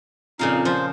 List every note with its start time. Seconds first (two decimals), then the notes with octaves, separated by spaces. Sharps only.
0.39 F2 A#2 C#3 D#4 F5
0.65 F3 C5